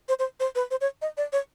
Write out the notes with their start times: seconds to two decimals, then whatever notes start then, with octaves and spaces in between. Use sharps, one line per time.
0.09 C5
0.19 C5
0.40 C5
0.55 B4
0.71 C5
0.81 C#5
1.02 D#5
1.17 D5
1.33 C#5